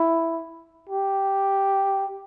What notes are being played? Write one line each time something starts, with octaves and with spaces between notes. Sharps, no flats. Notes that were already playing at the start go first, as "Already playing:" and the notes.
Already playing: E4
G4